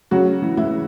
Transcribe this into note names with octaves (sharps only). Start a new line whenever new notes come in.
C#3 F#3 F#4
E3
E3 E4